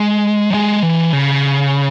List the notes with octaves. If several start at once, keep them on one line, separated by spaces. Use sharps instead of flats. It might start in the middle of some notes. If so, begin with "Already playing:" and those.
Already playing: G#3
F#3
G#3
E3
C#3